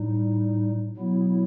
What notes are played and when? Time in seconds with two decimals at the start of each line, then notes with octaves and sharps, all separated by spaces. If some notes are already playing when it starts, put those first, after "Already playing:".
Already playing: A2 G3 D#4
0.97 B2 F#3 B3 E4